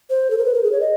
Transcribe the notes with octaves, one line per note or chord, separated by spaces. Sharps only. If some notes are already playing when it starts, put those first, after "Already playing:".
C5
A4
A#4
B4
A#4
G#4
C#5
D#5